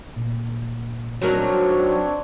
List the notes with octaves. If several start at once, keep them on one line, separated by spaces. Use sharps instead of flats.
A#2
F#3 C4 D4 D#4 A#4 C#5 A#5